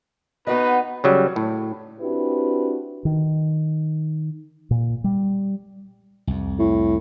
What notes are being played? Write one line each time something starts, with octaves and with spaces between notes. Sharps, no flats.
B3 D#4 F#4 B4 D#5
C#3 F#3 G3
A2
C4 D4 E4 F#4 G4 B4
D#3
A#2
G3
C2 F2
A2